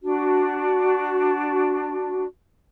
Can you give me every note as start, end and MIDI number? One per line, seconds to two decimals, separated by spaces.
0.01 2.25 62
0.01 2.25 66